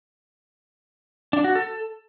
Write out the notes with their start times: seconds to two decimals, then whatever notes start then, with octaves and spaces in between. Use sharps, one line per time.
1.33 D4
1.44 F#4
1.55 A4